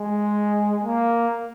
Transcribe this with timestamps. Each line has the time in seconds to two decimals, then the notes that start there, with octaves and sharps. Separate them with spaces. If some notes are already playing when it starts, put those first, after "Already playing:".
Already playing: G#3
0.84 A#3